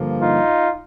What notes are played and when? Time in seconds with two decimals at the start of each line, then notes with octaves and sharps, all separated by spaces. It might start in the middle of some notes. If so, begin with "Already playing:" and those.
Already playing: G2 D3 F3 A#3
0.20 D#4 F4